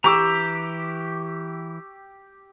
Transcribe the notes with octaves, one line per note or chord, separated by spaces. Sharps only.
E3 G4 A#5 C#6 D6 E6